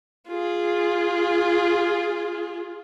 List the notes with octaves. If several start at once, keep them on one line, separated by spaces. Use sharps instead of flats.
F4 G#4